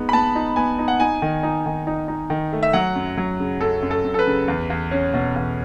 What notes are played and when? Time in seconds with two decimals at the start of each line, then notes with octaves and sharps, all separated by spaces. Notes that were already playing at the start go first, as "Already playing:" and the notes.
Already playing: G#3 B3 D#4
0.09 B5
0.13 B3 A5
0.35 D#4
0.56 B3 G#5
0.79 D#4
0.88 F#5
1.00 D#4 G#5
1.22 D#3
1.43 D#4
1.66 D#3
1.87 D#4
2.08 D#4
2.30 D#3
2.52 A3
2.63 E5
2.73 F#3 F#5
2.95 F#2
3.17 F#3
3.39 C#3
3.61 F#2 A4
3.82 F#2
3.91 A4
4.05 F#2
4.14 A4
4.19 B4
4.27 C#3
4.48 E2
4.70 E2
4.91 C#4
5.14 B2
5.36 E2